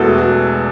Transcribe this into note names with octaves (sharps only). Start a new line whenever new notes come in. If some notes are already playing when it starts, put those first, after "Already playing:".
Already playing: E1 E2 E3 A3 F#4 A4
F#4